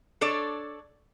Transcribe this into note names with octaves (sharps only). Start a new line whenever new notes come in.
D4 A4 C#5 D5